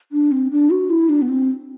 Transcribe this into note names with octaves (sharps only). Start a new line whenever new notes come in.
D4
C4
D4
F#4
E4
D4
B3
C4